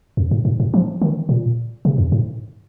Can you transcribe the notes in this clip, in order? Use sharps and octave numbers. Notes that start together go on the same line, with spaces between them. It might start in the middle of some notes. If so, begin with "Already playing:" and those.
F2
G#2
G#2
G#2
F3
D#3
A#2
C3
F2
G#2